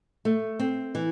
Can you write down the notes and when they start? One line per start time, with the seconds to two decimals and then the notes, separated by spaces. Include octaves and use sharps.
0.25 A3
0.60 C4
0.95 E3